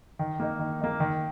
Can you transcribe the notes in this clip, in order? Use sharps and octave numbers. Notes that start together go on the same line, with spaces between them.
D#3
A#3 D#4
D#3
A#3 D#4
D#3